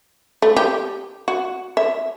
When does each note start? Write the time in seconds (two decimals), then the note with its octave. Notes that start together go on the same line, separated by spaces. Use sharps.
0.42 A3
0.56 G4
1.28 F#4
1.77 E5